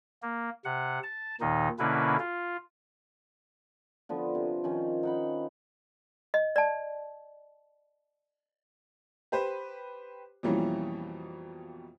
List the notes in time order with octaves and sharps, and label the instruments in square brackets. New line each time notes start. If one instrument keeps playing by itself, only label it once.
[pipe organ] A#3
C3 F#5
A5
D#2 A#2 D#3 D#4
B2 D3 A#3 C#4 E4 B4
F4
[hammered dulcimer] D3 F3 B3
C3
D#3 F3 C#4
D#4 F#5 B5
[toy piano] D#5
D5 A5
[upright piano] G4 B4 C5
F2 B2 E3 G3 A#3 C#4